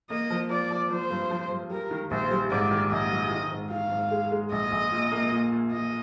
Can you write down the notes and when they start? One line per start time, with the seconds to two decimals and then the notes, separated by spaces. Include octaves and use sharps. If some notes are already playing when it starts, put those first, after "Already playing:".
0.10 A#3 D#5
0.30 F3
0.50 F3 D5
0.71 F3
0.90 F3 C5
1.11 G2
1.31 F3
1.51 G2
1.70 G3 A#4
1.91 D#3
2.11 A#1 C5
2.31 G3
2.51 G#2 D5
2.71 D#3
2.91 A#1 D#5
3.11 G3
3.31 D#3
3.52 G#2
3.71 D#3 F5
3.91 G#2
4.11 G#3
4.32 G#3
4.51 A#1 D#5
4.72 A#1
4.92 A#2
5.12 A#3
5.32 A#2
5.52 A#2
5.72 A#2 D#5